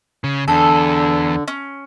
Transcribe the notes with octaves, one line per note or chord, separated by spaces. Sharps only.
C#3
E2 D3 A4
C#4